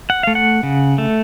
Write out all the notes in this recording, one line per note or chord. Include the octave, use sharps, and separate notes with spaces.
F#5
A3 F5
F#5
C#3
A3